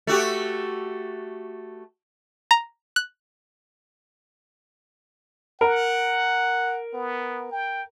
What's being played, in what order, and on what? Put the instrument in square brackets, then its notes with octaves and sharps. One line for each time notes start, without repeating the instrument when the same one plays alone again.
[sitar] A3 F#4 G4
[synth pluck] A#5
F#6
[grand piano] A#4 [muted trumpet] F#5
[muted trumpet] B3
G5